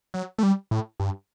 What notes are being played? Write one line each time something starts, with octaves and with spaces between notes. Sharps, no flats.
F#3
A3
G3
A2
G2